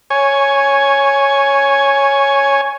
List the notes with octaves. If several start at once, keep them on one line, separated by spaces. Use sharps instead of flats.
C#5 G#5